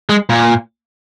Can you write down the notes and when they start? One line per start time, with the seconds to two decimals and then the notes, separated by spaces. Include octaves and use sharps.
0.09 G#3
0.29 A#2